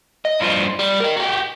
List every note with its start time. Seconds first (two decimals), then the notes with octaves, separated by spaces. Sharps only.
0.25 D#5
0.40 G2 F3
0.79 G3
1.00 A#4 D#5
1.17 F#4 G4